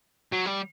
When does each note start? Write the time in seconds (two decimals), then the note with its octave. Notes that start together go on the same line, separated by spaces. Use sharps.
0.32 F#3
0.46 G3